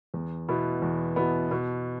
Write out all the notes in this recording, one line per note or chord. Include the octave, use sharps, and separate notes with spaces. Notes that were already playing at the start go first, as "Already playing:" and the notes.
E2
B2 B3 E4
E2
B2 B3 E4
B2